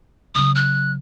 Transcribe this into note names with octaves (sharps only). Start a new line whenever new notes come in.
C#3 F#3 D#6
F#6